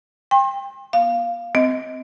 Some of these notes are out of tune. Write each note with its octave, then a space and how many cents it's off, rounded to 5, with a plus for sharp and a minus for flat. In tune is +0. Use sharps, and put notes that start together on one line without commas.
G5 +25 C6 +40
B3 -40 F5 -5
C4 -25 D#5 +25